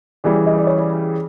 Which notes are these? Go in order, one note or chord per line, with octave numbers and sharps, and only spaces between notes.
C#3 E3 G3 D5
D#5
D5
C#5
D5